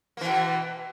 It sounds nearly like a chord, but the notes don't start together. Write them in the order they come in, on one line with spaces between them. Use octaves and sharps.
A#3 E3 B2